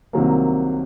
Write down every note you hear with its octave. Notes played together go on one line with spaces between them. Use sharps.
C2 C3 D#3 F#3 A#3